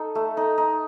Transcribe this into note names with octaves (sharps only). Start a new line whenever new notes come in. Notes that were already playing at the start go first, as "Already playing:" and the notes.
Already playing: D#4 A4
A3
D#4
D#4